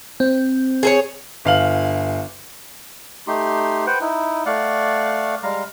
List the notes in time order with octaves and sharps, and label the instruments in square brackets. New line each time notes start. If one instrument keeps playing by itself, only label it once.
[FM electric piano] C4
[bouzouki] G#4 A4 C#5
[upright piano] G1 F5 F#7
[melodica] A3 D#4 G4 C6
B4 C5 F#5 G5
D#4 E4
A3 D5 F5 F#5
G3 G#3 F5 A#5